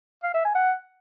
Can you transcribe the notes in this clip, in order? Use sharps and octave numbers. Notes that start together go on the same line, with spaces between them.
F5
E5
G#5
F#5